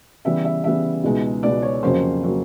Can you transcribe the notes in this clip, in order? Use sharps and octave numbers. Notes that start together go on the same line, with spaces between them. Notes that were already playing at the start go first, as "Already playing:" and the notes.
C#3 E3 G3 B3 E5
E5
C#3 E3 G3 B3 E5
C#2 B2 G#3 B3 D#4
C#2 B2 G#3 B3 D#4 D5
C#5
F2 C#3 F#3 A#3 C5
C#3 F#3 A#3